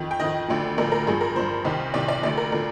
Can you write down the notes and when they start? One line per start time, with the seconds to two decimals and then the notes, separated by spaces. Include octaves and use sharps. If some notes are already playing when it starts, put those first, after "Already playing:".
Already playing: F2 D#3
0.11 G5
0.20 F2 D#3 D#5
0.48 D2 D3 F3
0.78 D2 D3 F3 A#4
0.92 A#4
1.07 G2 F3 G#4
1.21 A#4
1.36 G2 F3 C5
1.65 C2 C3 D#3
1.94 C2 C3 D#3 D5
2.08 D5
2.23 D2 D3 F3 D5
2.37 A#4
2.52 D3 F3 A#4